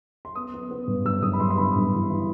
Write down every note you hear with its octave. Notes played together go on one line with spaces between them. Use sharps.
C6
B3 D#6
B3
B3
G2
G2 E6
G2 D#6
B5
G2 C6
C6
B3 B5
G2
E3
E3